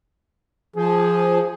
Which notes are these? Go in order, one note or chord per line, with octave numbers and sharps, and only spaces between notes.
F3 G#4